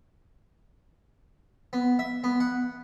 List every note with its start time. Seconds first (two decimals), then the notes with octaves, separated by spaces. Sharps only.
1.73 B3
1.99 E5
2.24 B3
2.40 F#5